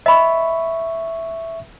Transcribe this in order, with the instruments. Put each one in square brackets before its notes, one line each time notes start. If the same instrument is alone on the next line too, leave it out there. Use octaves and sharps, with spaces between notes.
[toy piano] D#5 B5 [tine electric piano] E5 C#6